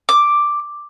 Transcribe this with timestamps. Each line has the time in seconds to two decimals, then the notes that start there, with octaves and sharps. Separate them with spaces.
0.09 D6